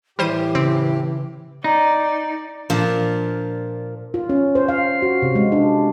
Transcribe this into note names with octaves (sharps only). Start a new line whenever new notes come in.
A2 E3 G3 G4 C5 D#7
C#3 C4
D#4 D5 A#5
A#2 F3 D4 F4
F4
C#4
C5
F5
F#4
C3
G#3
D4